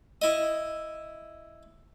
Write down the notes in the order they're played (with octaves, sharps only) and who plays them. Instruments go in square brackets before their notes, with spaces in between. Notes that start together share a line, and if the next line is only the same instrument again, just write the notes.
[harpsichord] E4 D#5